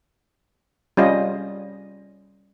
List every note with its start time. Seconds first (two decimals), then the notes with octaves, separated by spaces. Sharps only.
0.97 G3 C#4 F4 D#5